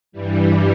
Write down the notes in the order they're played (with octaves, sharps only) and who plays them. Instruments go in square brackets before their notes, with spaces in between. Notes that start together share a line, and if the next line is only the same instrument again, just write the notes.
[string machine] G2 E3 G3